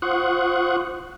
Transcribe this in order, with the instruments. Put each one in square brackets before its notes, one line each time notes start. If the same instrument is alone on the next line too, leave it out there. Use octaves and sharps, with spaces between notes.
[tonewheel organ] F4 C5 F#5 C#6 D#6 F#6